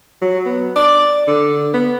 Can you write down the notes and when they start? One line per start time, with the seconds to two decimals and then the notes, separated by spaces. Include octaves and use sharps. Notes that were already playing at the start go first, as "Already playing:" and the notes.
0.22 F#3
0.46 B3
0.76 D5
1.28 D3
1.74 B3